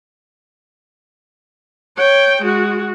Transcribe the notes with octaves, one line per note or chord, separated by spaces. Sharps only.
C#5 G5
G#3 F#4